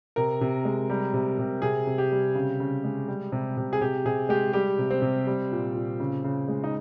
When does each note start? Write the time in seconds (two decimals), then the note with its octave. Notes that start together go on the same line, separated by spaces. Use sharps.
0.16 C3 A#4
0.41 C3
0.65 G#3
0.90 G3
1.14 C3
1.39 C3
1.62 C3 G#4
1.87 C3
1.98 G4
2.12 G3
2.35 C#3
2.60 C#3
2.84 G#3
3.08 G3
3.32 C3
3.57 C3
3.73 G#4
3.81 C3 G4
4.06 C3 G#4
4.29 G#3 G4
4.53 G3 G4
4.79 C3
4.90 C4
5.02 C3
5.27 G3
5.52 A#2
5.75 A#2
6.00 C#3
6.24 C#3
6.48 G#3
6.64 D#4